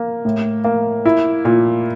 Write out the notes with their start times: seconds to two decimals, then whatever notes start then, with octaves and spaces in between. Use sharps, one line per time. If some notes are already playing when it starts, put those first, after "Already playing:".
Already playing: A#3
0.25 A2
0.64 A#3
1.06 E4
1.45 A#2